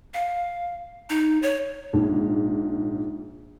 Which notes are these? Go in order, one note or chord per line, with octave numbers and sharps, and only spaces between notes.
F5
D#4
C#5
A#1 G#2